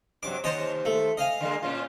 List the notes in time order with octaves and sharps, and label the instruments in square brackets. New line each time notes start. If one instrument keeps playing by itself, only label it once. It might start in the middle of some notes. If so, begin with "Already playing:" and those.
[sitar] G2 C3 F#3 [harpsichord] D6
[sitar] D#2 C5 [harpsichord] C#5 D#5 A5
[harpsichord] A3
D#5 F5 G#5
[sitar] D3 G#3 A#3
A#2 C#4 F4